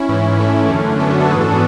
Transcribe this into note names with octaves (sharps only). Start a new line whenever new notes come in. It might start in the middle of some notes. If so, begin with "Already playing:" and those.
Already playing: C#4 E4
G#2 E3
A3 C#4
F#2 D3
B3 D4
D4 F#4
F#4 A4
G#2 E3 G#4 B4
F#4 A4
B3 D4